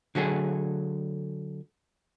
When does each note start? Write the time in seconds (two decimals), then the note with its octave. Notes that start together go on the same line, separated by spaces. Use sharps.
0.15 D3 F#3 A3 G#4